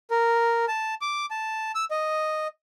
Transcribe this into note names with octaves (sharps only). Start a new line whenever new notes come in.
A#4
A5
D6
A5
E6
D#5